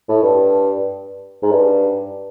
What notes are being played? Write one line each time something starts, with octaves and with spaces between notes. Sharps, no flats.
A2
G2
G#2
G2